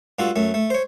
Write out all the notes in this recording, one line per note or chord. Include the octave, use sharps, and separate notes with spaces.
G2 F4 F#4 A4
F#2 A3
A3
C5 C#5